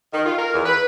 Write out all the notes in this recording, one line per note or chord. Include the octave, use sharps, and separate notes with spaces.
D#3
F4
A#4
E2
B4